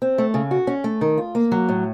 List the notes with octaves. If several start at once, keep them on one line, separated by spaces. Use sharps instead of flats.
C4
A3
C#3
F#4
C#4
A3
D#3
F4
A#3
F#3
A2